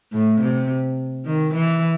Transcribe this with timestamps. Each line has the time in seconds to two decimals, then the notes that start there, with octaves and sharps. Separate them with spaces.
0.12 A2
0.41 C3
1.26 D#3
1.54 E3